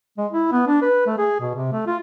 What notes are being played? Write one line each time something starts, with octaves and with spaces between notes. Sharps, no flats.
G#3
E4
B3
D4
B4
A3
G#4
B2
C3
A3
F4